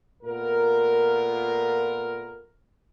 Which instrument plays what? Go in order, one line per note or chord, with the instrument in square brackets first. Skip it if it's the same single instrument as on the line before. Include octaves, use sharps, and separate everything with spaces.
[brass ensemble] A#2 A3 B3 F4 A#4